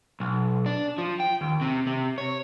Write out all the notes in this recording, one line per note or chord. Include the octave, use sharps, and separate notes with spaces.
B1
D4
F3
G5
D#2
C3
C3
C#5